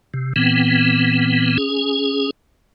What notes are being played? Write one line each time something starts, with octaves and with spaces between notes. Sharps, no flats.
C3
A#2 E3 B3 C4
C#4 G#4